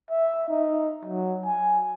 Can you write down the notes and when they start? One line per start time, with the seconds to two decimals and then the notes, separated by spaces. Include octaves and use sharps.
0.10 E5
0.49 D#4
1.05 F#3
1.46 G#5